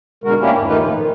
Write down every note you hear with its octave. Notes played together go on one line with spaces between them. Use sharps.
B2 D3 G#3 F#4 A#4
E3 A#3 C#4 D4 E4 G4
E2 G#2
D#3 A3 A#3 D#4 F4 B4
A#2 F3
D#3